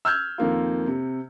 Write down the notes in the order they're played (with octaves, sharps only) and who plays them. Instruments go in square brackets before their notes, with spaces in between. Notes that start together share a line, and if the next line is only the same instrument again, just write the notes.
[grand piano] E6 F6 G6 G#6
F2 D#3 A#3 F4
C3